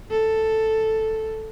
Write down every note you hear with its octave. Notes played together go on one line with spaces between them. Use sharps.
A4